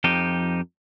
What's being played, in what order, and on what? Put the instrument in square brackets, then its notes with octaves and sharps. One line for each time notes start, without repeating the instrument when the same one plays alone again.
[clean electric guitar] F2 F3 D#4 G4